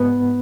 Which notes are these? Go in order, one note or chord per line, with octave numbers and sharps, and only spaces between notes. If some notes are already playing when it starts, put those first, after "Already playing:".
Already playing: G#2 B3 B4